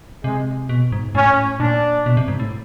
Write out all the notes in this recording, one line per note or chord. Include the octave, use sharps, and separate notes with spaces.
C3 G#3
B2
G#2
A2 C#4
A#2 D4
B2
C3
G#2
A2